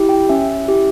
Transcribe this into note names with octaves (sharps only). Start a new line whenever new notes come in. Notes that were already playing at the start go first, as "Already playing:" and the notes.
Already playing: E4 G4
G5
C#4 E5
E4 G4